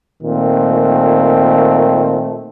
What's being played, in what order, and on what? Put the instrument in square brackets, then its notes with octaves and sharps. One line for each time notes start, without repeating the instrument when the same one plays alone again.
[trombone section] A#2 D#3 A3 C4